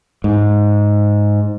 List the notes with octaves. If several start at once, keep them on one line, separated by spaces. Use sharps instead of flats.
G#2